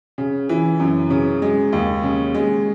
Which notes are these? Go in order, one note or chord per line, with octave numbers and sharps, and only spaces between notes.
C#3
E3
F#2
C#3
G#3
D#2
C#3
G#3